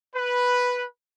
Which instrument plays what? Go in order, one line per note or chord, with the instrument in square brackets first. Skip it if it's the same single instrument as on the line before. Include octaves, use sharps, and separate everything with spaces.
[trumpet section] B4